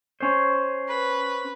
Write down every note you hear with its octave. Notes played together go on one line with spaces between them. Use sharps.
C#4 C5
B4